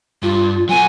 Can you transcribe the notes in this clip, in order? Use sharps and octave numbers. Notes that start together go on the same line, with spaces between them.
G2 F4
F#3 B3 G#5